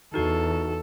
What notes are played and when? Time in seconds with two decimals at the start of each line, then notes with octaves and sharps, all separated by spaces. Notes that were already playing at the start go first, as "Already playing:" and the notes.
0.14 E2 D#4 F#4 A4